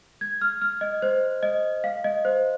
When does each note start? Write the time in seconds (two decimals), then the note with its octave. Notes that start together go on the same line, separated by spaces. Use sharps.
0.21 G#6
0.41 F6
0.62 F6
0.81 D#5
1.02 C5
1.43 D#5
1.84 F5
2.04 D#5
2.25 C5